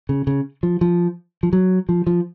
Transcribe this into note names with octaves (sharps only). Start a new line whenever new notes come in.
C#3
C#3
F3
F3
F3
F#3
F3
F3